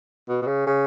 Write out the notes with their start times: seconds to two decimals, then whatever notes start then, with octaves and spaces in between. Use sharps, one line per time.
0.29 B2
0.42 B2
0.47 C#3
0.66 C#3